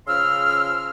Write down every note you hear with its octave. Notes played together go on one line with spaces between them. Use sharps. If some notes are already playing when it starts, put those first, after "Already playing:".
C#3 F3 C6 E6 F6